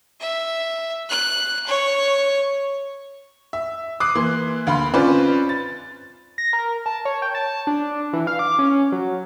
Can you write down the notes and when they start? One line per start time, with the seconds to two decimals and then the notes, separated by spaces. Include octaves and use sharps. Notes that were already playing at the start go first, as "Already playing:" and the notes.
0.20 E5
1.09 F#6
1.67 C#5
3.53 E5
4.00 D6 D#6 F#6 C7
4.15 E3 A#3 C6
4.67 D2 F5 B5 C6
4.94 C4 C#4 F4 B4 C5 D5
5.49 A6
6.38 A#6
6.53 A#4
6.86 A5
7.05 C#5
7.22 G5
7.35 A5
7.67 D4
8.13 E3
8.27 F5
8.39 D6
8.59 C#4
8.92 F#3